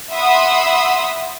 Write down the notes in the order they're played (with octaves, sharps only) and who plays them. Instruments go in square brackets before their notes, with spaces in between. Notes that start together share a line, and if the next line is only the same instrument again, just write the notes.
[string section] E5 F#5 B5 C6 D#6 E6